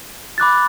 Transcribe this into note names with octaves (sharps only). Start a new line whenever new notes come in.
B5 D6 F#6 A6